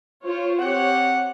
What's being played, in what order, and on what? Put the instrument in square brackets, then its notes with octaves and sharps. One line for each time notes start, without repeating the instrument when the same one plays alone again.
[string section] F4 C5 C#5
[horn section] C4 F#5 [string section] G4 C#5